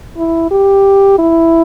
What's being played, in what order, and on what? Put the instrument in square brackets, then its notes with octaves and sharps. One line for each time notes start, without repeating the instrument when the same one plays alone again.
[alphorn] E4
G4
E4